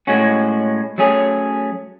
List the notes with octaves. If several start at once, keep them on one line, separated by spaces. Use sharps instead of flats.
A2 G#3 C#4 F#4
F#3 A3 C#4 G#4